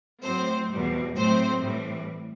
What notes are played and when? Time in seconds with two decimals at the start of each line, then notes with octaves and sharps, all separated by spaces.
0.23 A2 F#3 C4 C5
0.70 E2 B2 G3
1.16 A2 F#3 A3 C4 C5
1.62 A2 E3 G3